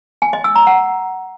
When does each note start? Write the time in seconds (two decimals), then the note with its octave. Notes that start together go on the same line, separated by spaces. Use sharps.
0.22 G#5
0.33 D#5
0.44 E6
0.56 A#5
0.67 F#5